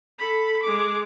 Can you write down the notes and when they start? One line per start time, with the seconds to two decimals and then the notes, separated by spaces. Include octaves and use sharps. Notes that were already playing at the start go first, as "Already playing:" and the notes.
0.19 A4 B5
0.63 G#3 D6